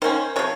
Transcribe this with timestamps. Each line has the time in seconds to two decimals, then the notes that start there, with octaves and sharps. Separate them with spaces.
0.02 D#3 A#3 C#4 C5
0.36 C3 F3 C#5